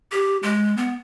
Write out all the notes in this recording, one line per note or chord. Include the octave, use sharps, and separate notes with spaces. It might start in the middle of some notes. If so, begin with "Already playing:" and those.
G4
G#3
B3